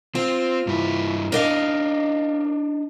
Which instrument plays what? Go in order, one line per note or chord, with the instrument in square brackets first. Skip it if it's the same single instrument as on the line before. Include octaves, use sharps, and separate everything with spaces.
[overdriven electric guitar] C4 [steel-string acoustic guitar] F4
[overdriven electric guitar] G2 E4
[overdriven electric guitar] D4 D#4 [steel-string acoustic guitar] A#4 D#5 F5